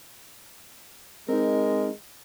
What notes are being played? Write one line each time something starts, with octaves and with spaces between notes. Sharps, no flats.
G#3 C4 D#4 A#4